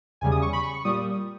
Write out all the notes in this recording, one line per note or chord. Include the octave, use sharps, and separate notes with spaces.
E2 C#3 G3 G#5
D#6
C#6
B5
C#6
C#6
A#2 G3 D#6